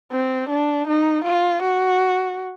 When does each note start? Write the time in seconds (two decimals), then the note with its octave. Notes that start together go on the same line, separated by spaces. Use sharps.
0.12 C4
0.49 D4
0.87 D#4
1.24 F4
1.62 F#4